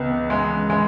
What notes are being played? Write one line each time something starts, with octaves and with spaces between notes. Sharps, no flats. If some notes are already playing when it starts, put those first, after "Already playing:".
Already playing: C#2 B3
G#3
G#3